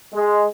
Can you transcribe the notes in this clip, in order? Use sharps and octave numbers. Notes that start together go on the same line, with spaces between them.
G#3